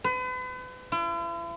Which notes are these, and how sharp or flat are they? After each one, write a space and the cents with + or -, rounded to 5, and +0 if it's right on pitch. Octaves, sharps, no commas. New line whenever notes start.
B4 +40
E4 +45